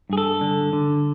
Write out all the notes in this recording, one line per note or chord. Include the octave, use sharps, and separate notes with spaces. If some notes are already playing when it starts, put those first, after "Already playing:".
G2 G#4
A4
D3
D3